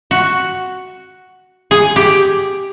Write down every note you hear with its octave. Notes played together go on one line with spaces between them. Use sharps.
F#4
G#4
G4